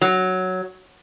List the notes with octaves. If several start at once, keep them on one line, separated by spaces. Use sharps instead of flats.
F#3